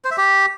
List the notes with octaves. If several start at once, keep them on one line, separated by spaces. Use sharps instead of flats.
C5
E5
G4